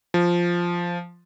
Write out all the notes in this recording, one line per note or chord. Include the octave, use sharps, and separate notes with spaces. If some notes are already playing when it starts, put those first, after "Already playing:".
F3